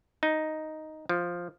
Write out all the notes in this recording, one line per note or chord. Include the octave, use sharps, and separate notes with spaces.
D#4
F3